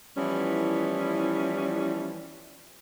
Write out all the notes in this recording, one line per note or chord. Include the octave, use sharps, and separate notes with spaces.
E3 F3 G3 B3 C#4 E4